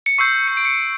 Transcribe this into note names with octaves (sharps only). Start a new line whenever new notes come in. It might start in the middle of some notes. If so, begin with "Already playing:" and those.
C#7
C#6 E6 G6 C7
C#7
D7
C#7